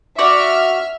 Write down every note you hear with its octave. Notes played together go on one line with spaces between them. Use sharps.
F#4 D5 E5 C#6 F6